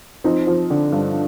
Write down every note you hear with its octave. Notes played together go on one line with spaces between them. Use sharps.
F3 C4 D#4
F3
D3
G2